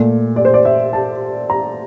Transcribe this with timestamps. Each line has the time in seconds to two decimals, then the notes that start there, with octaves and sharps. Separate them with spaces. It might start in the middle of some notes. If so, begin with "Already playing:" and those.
Already playing: A#2 A3
0.36 D5
0.45 C5
0.54 D5
0.65 E5
0.93 A5
1.50 A#5